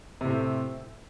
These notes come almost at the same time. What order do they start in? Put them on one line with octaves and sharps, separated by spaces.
C3 A2 C4 A3